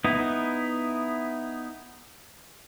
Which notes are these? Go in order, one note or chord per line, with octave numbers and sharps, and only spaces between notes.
B3 D#4 E4